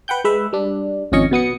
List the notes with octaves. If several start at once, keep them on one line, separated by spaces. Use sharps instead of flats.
B4 F#5 G5 G6
G#3 B4 E5
G3 D4
G#1 F2 C#4 D#5 C#6
B2 B3 D#6 C#7